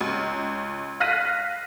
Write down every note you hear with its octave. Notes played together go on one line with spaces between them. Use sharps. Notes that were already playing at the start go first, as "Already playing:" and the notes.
C#2
F5 F6 F#6 A#6 B6 D#7